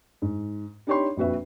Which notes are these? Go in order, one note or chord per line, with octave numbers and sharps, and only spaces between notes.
G#2
D4 D#4 G4 C#5 B5 C6
A#1 F2 F#4 B4 E5